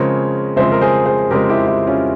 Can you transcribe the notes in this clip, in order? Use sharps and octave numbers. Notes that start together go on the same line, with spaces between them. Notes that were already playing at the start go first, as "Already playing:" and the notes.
Already playing: C#3 F3 G#3 C4 A#4 C#5
C#3 F3 G#3 C4 C5 E5
A#4
G#4 C5
G#4 C5
C#3 F3 G#3 C4 G4 A#4
E4 G4
E4 G4
C#4 F4